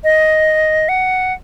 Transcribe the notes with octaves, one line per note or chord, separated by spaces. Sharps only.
D#5
F#5